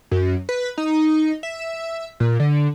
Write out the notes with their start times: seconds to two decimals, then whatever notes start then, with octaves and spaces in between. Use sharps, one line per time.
0.11 F#2
0.49 B4
0.77 D#4
1.43 E5
2.20 A#2
2.40 D3